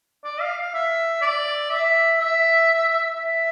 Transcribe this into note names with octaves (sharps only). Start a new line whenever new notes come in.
D5
F5
F5
E5
D5
E5
E5
E5